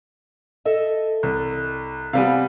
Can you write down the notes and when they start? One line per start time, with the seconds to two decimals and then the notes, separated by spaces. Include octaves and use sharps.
0.65 A4 D#5 E5
1.23 C2
2.13 C3 G3 B3 F5 G#5